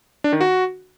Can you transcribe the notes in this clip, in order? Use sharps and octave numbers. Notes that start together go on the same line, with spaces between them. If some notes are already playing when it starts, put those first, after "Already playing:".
D4
D#3
F#4